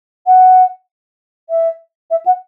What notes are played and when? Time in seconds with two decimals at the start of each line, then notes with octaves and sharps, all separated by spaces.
0.26 F#5
1.49 E5
2.10 E5
2.26 F#5